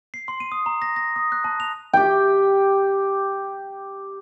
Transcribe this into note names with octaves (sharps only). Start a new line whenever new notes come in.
C7
C6
D#7
D#6
A#5
A#6
A#6
D#6
F#6
A5
F7
G4 G5